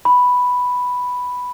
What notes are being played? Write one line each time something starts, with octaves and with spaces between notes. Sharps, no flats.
B5